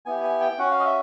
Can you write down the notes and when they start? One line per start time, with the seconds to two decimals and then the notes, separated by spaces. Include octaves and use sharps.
0.06 B3 E4 G4 G#5
0.23 G#5
0.40 G5
0.58 C#4 F#4 F#5
0.71 F5
0.80 D#5
0.85 E5